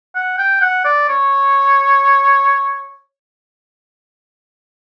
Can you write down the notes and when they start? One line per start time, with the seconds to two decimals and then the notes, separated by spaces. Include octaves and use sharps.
0.16 F#5
0.39 G5
0.62 F#5
0.85 D5
1.09 C#5